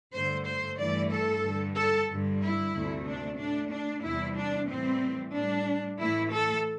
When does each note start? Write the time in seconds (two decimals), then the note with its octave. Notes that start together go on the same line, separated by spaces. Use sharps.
0.13 G2 D3 A3 C5
0.46 C5
0.78 G2 E3 A3 D5
1.11 A4
1.43 G2 D3 G3
1.76 A4
2.08 G2 D3 G3
2.41 E4
2.74 D2 C3 A3
3.06 D4
3.38 A2 A3 D4
3.71 D4
4.03 E2 C3 E3 G3 E4
4.37 D4
4.69 A2 E3 G3 C4
5.34 A2 G3 D4
5.99 A2 E3 A3 E4
6.32 A4